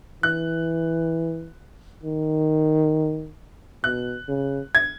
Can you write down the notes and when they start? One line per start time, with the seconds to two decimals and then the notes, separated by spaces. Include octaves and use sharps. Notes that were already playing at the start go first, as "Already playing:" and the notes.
0.23 E3 F#6
2.03 D#3
3.84 B2 F#6
4.29 C#3
4.75 G#6